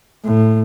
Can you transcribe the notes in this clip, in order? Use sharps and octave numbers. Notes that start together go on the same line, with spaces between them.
A2